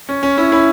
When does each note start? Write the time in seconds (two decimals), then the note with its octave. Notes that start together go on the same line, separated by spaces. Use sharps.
0.09 C#4
0.23 C#4
0.37 C#4 E4
0.52 C#4 E4